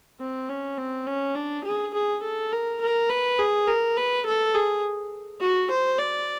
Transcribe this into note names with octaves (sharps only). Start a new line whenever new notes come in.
C4
C#4
C4
C#4
D4
G#4
G#4
A4
A#4
A#4
B4
G#4
A#4
B4
A4
G#4
F#4
C5
D5